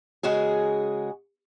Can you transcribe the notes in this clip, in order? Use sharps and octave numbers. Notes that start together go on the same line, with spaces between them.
C#3 G#3 F#4 G#4